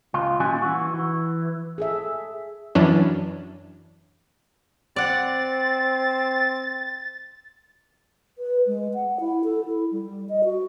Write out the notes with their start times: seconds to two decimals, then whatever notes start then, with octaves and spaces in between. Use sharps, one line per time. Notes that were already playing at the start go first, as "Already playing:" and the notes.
0.14 C#2 F4
0.40 A#2 D#3 G3 C#4 F#4 G#5
0.62 E3 F#4
0.94 E3
1.78 G#4 A4 E5
2.75 F#2 E3 F#3 C#4 D4
4.96 C4 D5 F#5 A6
8.38 B4
8.66 G#3
8.94 F#5
9.20 E4
9.44 A4
9.65 E4
9.92 G3
10.29 D#5
10.44 F#4